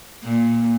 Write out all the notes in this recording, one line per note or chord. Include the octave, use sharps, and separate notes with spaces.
A#2